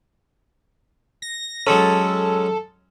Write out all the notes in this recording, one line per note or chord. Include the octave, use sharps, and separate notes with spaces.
A#6
F#3 G#3 C#4 A4